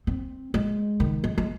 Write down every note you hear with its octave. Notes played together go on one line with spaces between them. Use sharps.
C4
G#3
D#3
G#3
G#3